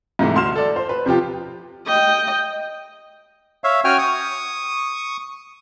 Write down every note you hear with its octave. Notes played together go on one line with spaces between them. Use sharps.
G#2 C3 E3 A3
D2 C6 F6 E7
A4 D5
C5
B4
C3 F3 F4 G4
D#5 G5
C#5 E5 F5
C#4 F#4 C#5 G5 G#5 F6
C#6 D#6